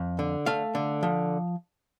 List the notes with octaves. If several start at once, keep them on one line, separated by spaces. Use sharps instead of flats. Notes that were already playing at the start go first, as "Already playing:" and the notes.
Already playing: F2
D3
A3 F5
D3
F3